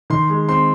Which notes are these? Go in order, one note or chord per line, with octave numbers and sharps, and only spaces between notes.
D#3 C6
G#3
C4 C6